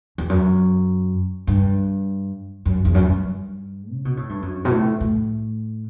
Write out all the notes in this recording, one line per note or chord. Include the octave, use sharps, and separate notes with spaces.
E2
F#2
G2
F#2
E2
F#2
G2
C#3
B2
A2
G2
F#2
B2
A2
A2